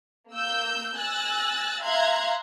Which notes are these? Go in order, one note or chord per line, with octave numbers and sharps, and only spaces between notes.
A#3 E6 G6
G#5 E6 F#6 A6 A#6
E5 F5 A#5 C6 F#6 G#6